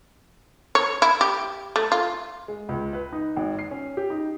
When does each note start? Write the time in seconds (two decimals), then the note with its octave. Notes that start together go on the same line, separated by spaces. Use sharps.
0.75 C#5
1.02 E4
1.21 G4
1.76 A3
1.92 F4
2.48 G#3
2.69 C#2
2.93 B4
3.13 D#4
3.36 G#1
3.59 C7
3.71 C#4
3.97 G4
4.10 D#4